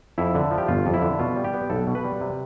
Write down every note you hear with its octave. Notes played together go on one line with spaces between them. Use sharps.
F2 E4
D3
F3
G4
G1 F4
F2
E4
D3
B2 F4
G3
G4
B3
B1 A4
B2
B4
G3
C3